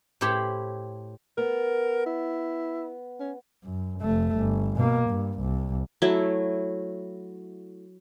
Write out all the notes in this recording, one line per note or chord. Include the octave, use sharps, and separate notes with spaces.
A2 E4 G4 C5 C#5 B5
B3 A#4
E4
C#4
F#2
F1 A3
G1
B2 A#3
G2
C2
F#3 A3 E4